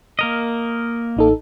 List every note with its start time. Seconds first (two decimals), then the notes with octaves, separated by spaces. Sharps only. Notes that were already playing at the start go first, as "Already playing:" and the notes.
0.19 A#3 A#4 D#5
1.17 A1 D#4 A4